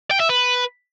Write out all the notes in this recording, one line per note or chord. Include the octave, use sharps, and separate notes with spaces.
G5
E5
B4